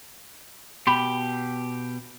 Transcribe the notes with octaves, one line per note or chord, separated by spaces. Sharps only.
B2 G4 B5